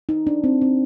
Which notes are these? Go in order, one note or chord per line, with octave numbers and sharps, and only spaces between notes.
D#4
D4
C4
C4